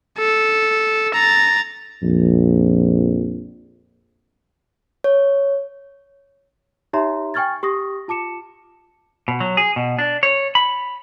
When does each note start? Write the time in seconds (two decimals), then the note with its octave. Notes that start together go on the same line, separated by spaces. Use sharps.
0.18 A4
1.14 A#5 A6
2.02 A#1 F2
5.04 C#5
6.93 D#4 G4 C#5 E5 A#5 C6
7.34 G5 G#5 C#6 F6 G#6 A6
7.63 G4 C#6 D#6 A#6
8.08 F4 A5 D6 C#7 E7
9.28 B2
9.40 F#3
9.57 G#4
9.76 B2
9.99 D4
10.23 C#5
10.55 B5